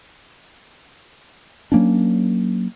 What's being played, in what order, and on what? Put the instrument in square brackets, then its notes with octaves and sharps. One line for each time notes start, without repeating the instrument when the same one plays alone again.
[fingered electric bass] F#3 A#3 C#4 D4